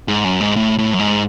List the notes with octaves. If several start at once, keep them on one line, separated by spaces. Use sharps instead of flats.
G#2
F#2
G#2
A2
A2
F#2
G#2